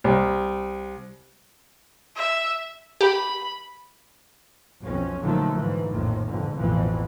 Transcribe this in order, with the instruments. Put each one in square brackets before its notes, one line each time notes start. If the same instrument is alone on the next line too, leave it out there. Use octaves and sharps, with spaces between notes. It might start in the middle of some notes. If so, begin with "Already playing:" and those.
[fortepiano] C2
[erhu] E5
[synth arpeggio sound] G4 [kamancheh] B5
[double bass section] B1 F2 C#4
A#2 D3 D#3 F3 F#3 A3
G#2 E3 F3
A#1 F2 A2 D#3 F3
F2 G#2 B2 D3
A1 F2 B2 E3 F3